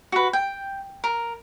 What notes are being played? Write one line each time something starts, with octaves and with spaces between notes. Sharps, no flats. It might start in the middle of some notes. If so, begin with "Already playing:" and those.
F#4 B4
G5
A#4